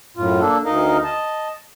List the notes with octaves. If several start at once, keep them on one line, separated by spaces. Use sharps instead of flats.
F#2 A2 F4
A#3 D4 A4
D2 D#4 A#4 D#5 F5
D#5 A5